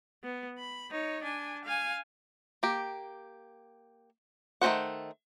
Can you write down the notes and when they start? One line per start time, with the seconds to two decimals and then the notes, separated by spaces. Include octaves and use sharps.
0.24 B3
0.58 B5
0.91 D#4 C#5
1.23 D4 G#5
1.64 F5 G#5
2.63 A#3 G4
4.61 D#3 A3 C#4 C5 F#5